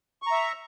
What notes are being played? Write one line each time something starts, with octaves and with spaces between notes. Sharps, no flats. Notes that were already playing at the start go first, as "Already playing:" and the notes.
E5 A#5 C#6